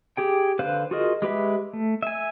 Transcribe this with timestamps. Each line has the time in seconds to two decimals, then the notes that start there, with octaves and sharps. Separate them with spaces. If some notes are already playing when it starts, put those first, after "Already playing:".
0.17 G4 G#4 G5
0.59 D3 B4 C5 F5 F#6
0.91 F4 F#4 G#4 A#4 D#5
1.22 G#3 G4 B4 E5
1.73 A3
2.02 E5 G#5